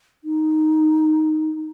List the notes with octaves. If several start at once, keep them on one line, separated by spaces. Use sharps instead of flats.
D#4